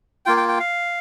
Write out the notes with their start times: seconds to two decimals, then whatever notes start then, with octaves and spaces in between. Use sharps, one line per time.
0.26 A#3 F4 G5
0.37 G5
0.48 G5
0.60 F5